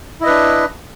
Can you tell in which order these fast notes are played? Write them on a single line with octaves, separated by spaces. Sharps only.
E4 D#5 B4 D4